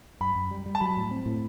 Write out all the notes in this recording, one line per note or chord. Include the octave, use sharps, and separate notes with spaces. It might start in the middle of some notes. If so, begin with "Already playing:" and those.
F#2 B5
F#2
G3
G3
A5
F#3 B5
A2
C4
A2